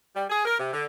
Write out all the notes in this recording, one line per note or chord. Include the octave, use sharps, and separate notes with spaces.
G3
G#4
A#4
C3
D3